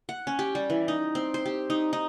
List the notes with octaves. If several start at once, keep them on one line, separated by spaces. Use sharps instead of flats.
F#5
C#4
G4
G3
E3
D#4
C4
C5
G4
D#4
D#4